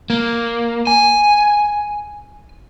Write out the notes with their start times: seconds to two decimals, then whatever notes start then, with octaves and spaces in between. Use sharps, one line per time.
0.10 A#3
0.87 G#5